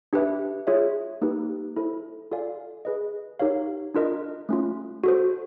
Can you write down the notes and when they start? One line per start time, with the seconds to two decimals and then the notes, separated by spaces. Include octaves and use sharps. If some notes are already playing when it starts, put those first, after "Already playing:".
0.13 D4 G4 B4 E5
0.67 F4 G#4 C#5 E5
1.22 A#3 D#4 G4 B4
1.76 E4 A4 C5
2.31 F4 A4 D5 F5 G#5
2.85 G#4 B4 D#5
3.39 D#4 G4 A#4 C#5 F5
3.94 D4 F4 A#4 D#5
4.49 A3 C#4 F4
5.04 F#4 A4 C5